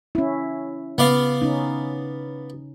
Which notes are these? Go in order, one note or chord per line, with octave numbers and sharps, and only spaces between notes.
C#4 E4
C#3 B3 D5 F5
C#4 D#4